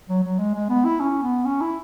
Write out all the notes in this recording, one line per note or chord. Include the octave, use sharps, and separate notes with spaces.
F#3
F#3
G#3
G#3
B3
E4
C#4
B3
C#4
E4